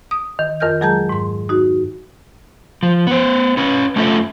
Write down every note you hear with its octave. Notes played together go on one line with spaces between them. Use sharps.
D#6
D#3
F2 D#3 A#4 G#5 F6 G6
F#3 G#3 G#4 A5 A#5 G6
G#2 C6
D#4 F#4
F3
B3 C5
C#4 B4
A3 C#4 D4 F4 A4 E5